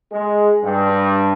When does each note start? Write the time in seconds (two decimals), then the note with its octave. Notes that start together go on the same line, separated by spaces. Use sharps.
0.11 G#3
0.62 G2